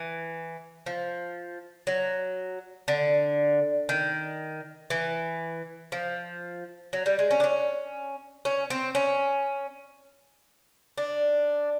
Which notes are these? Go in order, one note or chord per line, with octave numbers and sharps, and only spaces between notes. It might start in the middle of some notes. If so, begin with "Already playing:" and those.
Already playing: E3
F3
F#3
D3
D#3
E3
F3
F#3
G3
G#3
C#4
D4
C#4
C#4
C4
C#4
D4